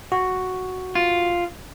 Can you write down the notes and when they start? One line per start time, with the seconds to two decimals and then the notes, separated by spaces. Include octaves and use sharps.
0.12 F#4
0.95 F4